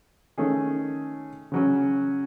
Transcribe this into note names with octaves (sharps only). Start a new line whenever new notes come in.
D#3 A3 C#4 G#4
C#3 F#3 C#4